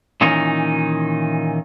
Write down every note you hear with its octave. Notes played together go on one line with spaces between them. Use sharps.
A#2 D#3 E3 C#4 D#4